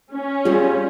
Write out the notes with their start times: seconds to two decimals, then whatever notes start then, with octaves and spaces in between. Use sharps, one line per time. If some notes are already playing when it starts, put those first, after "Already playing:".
0.14 C#4
0.45 G3 F4 G#4 D#5